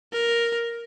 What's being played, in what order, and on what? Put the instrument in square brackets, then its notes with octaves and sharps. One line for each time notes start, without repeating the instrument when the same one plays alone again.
[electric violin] A#4